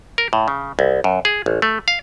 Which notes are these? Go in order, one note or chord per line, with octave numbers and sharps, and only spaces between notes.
A#4
A2
C#3
C2
F#2
G#4
A1
A3
F5